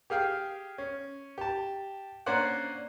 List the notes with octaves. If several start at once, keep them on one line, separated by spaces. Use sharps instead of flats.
G4 G#4 F5 G5
C#4
G4 A5
A#3 C#4 D4 C5 D5 F#5